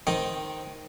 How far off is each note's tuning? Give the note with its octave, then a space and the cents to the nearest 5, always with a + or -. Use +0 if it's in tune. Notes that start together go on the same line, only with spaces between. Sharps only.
D#3 +0 C4 +0 D#5 +0